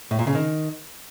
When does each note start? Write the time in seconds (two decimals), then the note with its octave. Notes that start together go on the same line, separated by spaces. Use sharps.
0.11 A2
0.19 A#2
0.27 C#3
0.35 D#3